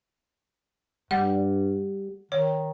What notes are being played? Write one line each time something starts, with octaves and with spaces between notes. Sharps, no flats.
G2 G3 F#5
D#3 C#5